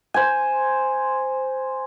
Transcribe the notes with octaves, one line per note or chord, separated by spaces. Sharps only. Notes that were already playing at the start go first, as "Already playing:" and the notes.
C5 G#5